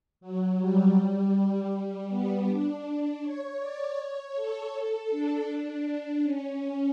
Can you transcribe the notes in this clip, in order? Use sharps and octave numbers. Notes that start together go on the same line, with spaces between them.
F#3
G3
G3
B3
D4
C#5
D5
C#5
A4
D4
D4
C#4
C#4